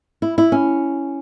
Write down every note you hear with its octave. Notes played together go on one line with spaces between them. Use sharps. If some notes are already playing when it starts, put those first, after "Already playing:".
E4
E4
C#4